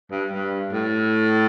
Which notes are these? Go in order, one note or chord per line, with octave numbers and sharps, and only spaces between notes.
G2
G2
A2